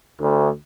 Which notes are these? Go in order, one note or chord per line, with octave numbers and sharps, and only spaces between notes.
D2